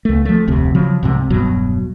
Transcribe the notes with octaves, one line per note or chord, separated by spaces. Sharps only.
C#2 A3
F3 A3
F1 D2 C3
C#3 F3 F#3
C2 G#2 C3
E1 G2 B2 F#3